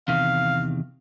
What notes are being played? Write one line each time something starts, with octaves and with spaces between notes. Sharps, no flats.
E2 C3 D#3 F5